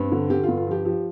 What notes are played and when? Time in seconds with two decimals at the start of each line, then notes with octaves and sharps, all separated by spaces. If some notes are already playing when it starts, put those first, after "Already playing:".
Already playing: G2 C4
0.12 D3
0.30 D3 G4
0.43 F4
0.48 G2
0.57 F4
0.67 F3 G4
0.85 F3 G4